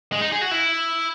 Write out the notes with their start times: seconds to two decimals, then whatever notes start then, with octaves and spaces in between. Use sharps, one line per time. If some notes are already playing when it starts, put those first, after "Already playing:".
0.12 G#3
0.21 D#4
0.32 G#4
0.41 F#4
0.51 E4